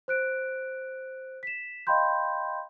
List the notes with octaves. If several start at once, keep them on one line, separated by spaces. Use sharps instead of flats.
C5 F#6 D7
B6 E7
D#5 F5 G5 B5 C6 G6